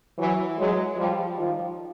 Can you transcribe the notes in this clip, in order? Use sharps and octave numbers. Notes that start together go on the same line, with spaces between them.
E3 F#3
F#3 G#3
F3 G3
D#3 F3